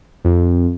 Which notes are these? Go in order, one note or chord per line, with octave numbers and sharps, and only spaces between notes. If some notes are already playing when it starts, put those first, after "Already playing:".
F2